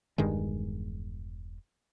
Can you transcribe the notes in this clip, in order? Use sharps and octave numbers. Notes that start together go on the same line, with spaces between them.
E1 G2 D#3 G#3